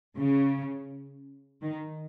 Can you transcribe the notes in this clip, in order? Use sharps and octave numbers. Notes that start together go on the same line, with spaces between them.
C#3
D#3